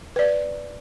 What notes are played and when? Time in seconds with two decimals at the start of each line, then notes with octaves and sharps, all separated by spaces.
0.16 B4 D5